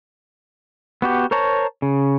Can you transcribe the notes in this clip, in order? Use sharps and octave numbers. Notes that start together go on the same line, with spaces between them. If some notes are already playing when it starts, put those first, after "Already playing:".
B3 F#4 G4
A#4 C5 C#5 A5 A#5
C#3